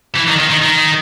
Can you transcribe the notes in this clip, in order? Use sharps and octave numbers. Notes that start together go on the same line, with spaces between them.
E3
D#3
D#3
D#3
D#3